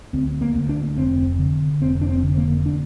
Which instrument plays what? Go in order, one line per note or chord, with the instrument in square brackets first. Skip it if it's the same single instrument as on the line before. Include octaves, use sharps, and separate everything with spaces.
[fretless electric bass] D2 C4
A#3
D2
D4
F1 C4
D3
F1 C4
D4
C4
D3
A#3
D4